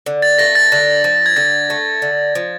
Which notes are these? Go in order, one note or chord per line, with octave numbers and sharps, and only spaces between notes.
D3
A6
A3 A#6
A6
D3
F3
G#6
D3 A6
A3
D3
F3